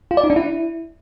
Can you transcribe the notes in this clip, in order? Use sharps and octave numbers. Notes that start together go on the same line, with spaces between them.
F4
D5
D#4
D4
E4